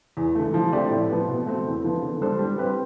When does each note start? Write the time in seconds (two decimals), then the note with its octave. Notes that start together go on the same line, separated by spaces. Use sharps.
0.17 E2
0.35 D3 A3
0.54 F3
0.72 A3 C4 G4 D5
0.91 A2
1.09 F3 B3
1.28 B2
1.46 A3 C4
1.66 E2
1.84 D3 F3 B3
2.03 D3
2.21 G3 D4 A4 C5
2.39 G3
2.58 C4 G4 B4